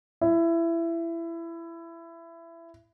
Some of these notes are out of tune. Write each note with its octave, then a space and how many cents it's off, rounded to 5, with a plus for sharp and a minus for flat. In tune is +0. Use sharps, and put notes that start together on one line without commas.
E4 +20